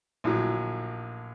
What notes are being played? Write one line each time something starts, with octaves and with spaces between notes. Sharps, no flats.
A#1 A2 F#3